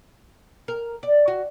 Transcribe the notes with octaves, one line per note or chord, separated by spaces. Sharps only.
A#4
D5
F#4